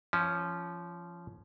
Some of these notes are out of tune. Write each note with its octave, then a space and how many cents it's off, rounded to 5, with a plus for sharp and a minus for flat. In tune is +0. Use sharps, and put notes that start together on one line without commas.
F3 -20 C#4 +0